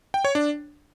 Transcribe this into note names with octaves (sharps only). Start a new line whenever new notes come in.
G5
C#5
D4